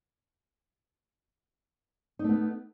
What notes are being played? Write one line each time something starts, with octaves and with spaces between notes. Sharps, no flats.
A3 B3 D#4